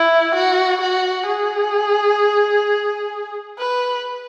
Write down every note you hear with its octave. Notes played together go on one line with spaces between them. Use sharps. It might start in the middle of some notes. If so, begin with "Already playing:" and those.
Already playing: E4
F#4
F#4
G#4
B4